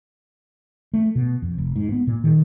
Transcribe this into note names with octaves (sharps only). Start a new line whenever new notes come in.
A3
B2
F2
F1
G#2
B3
A#2
D#3